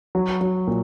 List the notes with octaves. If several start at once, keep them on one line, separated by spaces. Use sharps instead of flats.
F#3
F#3
A#2